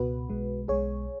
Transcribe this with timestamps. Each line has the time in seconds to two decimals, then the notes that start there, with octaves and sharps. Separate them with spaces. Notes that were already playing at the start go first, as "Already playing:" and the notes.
Already playing: C#2 B2 B3 F#4 B4
0.30 B1 B2 G#3
0.68 B1 B2 G#3 G#4 C#5